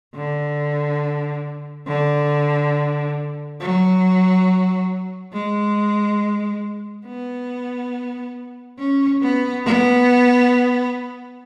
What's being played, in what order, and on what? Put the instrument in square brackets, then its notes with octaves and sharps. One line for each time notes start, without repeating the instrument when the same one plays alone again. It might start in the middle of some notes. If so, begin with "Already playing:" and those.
[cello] D3
D3
F#3
G#3
B3
C#4
B3
B3